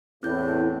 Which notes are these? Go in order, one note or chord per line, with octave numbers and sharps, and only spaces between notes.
E2 A2 C4 E4 G6